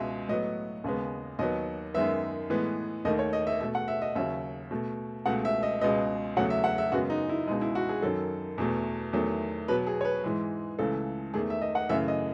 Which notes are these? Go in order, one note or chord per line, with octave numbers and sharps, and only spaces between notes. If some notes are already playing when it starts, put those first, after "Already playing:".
Already playing: C#2 B2 G#3 E5
A2 F#3 B3 D#5
D#2 C#3 G#3 B3
D#2 D#3 F#3 B3 D#5
F#2 D#3 G#3 B3 E5
A2 E3 G#3 B3
D#2 D#3 A3 D#5
C#5
D#5
E5
B2 A3 E5
F#5
E5
D#5
D#2 C#3 F#3 E5
B2 A3
C#2 B2 A3 F#5
E5
D#5
C#2 B2 G#3 B3 D#5
E2 C#3 F#3 A3 F#5
E5
F#5
E5
F#2 C#3 G#3 B3 F#4
D#4
E4
C#2 B2 G#3 D#4
E4
F#4
G#4
F#2 D#3 F#3 A4
E2 B2 A3
E2 D#3 F#3 A3
B2 F#3 B3 B4
G#4
C#5
B4
G#2 E3 G#3
C#2 C#3 E3 A3 A4
E2 D#3 A3 G#4
E5
D#5
F#5
F#2 C#3 E3 A3 E5
D#5